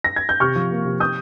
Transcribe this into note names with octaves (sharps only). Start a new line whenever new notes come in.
A#6
G#6
G6
C3 C#6 F6
F3
A#3
C3
D#6 G6